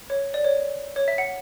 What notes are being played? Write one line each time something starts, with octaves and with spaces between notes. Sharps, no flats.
C#5
D5
C#5
C#5
E5
F#5